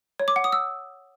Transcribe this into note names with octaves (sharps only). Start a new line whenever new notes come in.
C#5
D6
F#5
D#6
E6